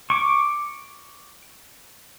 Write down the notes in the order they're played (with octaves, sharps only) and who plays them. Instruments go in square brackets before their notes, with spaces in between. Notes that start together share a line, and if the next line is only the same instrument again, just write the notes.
[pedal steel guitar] C#6 D6